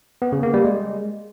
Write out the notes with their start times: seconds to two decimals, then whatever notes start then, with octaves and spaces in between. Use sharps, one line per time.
0.22 B3
0.32 C#3
0.43 A#3
0.54 G3
0.64 G#3